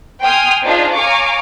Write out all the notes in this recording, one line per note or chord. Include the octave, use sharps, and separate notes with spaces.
G5 G#5 C6 D#6 F6
D4 D#4 F4 G#4 C5
C#5 F5 G#5 A#5 C#6 D6